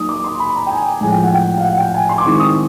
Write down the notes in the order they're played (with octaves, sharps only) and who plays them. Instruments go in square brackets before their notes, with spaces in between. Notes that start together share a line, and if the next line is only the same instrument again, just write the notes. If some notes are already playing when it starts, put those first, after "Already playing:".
Already playing: [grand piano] F#3 A#3 D#4 D#6
D6
C6
B5
A#5
G5
G#5
A2 F3 G#3 G#5
G5
F#5
G5
F5
F#5
G5
G#5
C6
D6
D#3 G#3 C4 E4 C#6
D#6